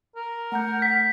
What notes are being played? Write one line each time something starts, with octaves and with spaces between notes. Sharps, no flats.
A#4
A3 F#5 A#5 G6
B6